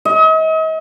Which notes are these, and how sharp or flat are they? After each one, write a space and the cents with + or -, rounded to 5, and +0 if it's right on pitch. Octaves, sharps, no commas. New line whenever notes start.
D#5 +40